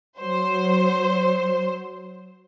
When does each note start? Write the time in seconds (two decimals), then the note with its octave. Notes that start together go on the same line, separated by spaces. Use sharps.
0.18 F#3 C5